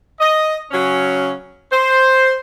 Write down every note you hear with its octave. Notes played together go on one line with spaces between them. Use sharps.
D#5
C#3 F#3 C#4
C5